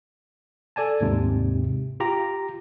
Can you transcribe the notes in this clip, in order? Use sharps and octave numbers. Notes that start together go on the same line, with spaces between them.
A4 D5 G#5 A5
D#2 G#2 C3
F4 G4 A#5